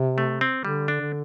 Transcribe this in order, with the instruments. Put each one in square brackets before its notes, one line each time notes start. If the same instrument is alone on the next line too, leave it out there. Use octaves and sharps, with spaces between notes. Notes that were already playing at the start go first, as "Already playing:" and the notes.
Already playing: [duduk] C3
[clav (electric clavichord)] A3
C4
[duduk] D3 [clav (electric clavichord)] G3
[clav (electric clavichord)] D4
[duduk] D3